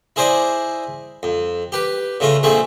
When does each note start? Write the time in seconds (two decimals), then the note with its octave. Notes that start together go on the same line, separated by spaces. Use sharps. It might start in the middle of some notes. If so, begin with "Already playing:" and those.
0.16 E4 G#4 C5 D5 D#5
1.23 F2
1.72 G4 B4
2.20 C#3 A3 F4 D#5
2.43 A#1 A3 C4 G#4 A5